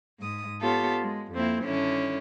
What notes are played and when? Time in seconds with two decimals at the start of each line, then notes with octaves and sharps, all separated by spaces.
0.19 G#2 D#6
0.61 B3 F4 G4 A4 C#5
1.00 G#3
1.32 F2 A#3 C4 E4
1.64 G2 D3 D#3 C#4 E4